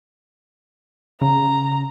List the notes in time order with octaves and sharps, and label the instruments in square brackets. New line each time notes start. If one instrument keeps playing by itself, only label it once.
[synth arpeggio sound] C#3 [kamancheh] A#5